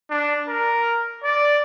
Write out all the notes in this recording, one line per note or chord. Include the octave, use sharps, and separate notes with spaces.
D4
A#4
D5